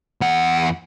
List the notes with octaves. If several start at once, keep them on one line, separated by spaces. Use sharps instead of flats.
E2 F#5